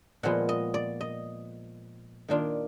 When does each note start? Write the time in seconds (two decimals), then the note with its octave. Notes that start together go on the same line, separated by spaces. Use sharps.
0.23 A#2 F3 G#3 B3 F4 F#5
0.49 D#5
0.74 D5
1.01 D#5
2.28 D#3 A#3 D4 F4